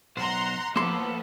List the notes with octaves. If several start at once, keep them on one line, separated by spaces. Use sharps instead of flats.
B1 C5 F#5 A#5 C6
A2 F3 A#3 B3 A4 C6